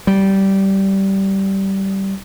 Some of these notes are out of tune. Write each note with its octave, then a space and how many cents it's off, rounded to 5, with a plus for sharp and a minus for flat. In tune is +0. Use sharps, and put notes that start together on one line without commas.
G3 -15